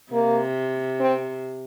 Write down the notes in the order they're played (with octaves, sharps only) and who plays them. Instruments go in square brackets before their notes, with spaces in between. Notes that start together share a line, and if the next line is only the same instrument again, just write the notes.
[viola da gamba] C3 [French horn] A#3
[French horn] C4